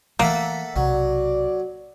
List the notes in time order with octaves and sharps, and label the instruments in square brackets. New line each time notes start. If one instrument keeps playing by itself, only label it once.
[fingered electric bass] E3 F3 A3 [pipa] A#3 [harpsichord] A4 E5 F#5
[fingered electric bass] B1 C3 [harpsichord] F#3 [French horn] D5